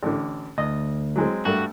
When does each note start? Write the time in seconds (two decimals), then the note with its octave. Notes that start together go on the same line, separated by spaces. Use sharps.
0.03 A1 D3
0.58 D2 D#5
1.16 F#3 G#3 C4
1.45 G2 A3 F#4